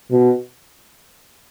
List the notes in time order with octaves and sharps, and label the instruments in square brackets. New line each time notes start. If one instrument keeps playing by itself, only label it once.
[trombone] B2